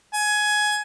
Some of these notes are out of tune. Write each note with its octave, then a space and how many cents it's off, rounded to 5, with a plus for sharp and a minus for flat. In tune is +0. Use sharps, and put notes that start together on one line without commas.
G#5 +15